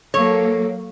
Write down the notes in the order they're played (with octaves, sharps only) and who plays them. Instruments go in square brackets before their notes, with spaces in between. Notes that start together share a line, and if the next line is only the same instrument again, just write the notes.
[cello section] F#3 A#3 [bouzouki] A4 [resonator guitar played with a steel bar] C#5